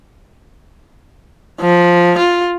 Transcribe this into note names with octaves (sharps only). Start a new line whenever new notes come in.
F3
F4